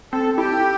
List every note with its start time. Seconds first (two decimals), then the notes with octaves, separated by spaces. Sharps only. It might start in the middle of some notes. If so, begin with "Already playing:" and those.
0.13 C4 A4
0.38 E4 G4